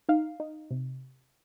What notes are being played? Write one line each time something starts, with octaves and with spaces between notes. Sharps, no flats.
D#4 F5
D#4
C3